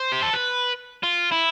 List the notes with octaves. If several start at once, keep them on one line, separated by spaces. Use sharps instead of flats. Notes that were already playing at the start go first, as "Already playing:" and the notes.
Already playing: C5
G4
A4
B4
F4
E4